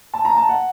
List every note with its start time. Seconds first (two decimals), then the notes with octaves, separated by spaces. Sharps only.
0.14 A5
0.25 A#5
0.37 A5
0.49 F#5